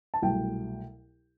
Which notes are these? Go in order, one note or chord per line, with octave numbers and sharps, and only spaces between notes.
A5
C2 B2 F#3 A3 G5